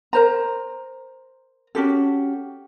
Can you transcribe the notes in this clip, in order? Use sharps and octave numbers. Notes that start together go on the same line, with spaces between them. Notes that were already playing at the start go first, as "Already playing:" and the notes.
A#4 C5 A#5
C#4 F#4 G4 A4